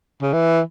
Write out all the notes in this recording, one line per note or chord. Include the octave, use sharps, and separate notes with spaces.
C#3
E3